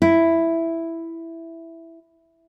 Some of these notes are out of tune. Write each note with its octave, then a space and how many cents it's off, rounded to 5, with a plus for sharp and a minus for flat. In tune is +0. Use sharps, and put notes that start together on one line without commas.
E4 +5